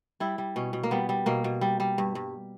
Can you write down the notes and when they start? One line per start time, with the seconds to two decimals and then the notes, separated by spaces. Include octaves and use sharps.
0.20 G3 E4
0.38 G3
0.56 B2 C#4
0.73 B2
0.83 A#3
0.91 G3 B3
1.09 G3
1.26 B2 A#3
1.44 B2
1.61 G3
1.80 G3
1.98 G2
2.15 G2